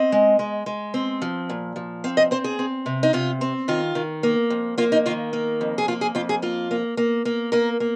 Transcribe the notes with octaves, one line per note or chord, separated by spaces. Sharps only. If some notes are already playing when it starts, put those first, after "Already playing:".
Already playing: C4 D#5
G#3
G#3
G#3
C4
F3
A#2
F3
C4 F5
D#5
C4 C5
G#4
C4
C3
D#4
C3 F4
C4
D#3 F4
D#3
A#3
F2
A#3 F4
D#4
D#3 F4
A#3
F2
G#4
A#3 F4
G#4
F2 F4
G#4
A#3 F4
A#3
A#3
A#3
A#3 A#4
A#3